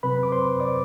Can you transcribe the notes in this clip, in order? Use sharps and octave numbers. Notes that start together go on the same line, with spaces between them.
C3 F#3 C4 B4 B5
D6
C5 C6
D5 D6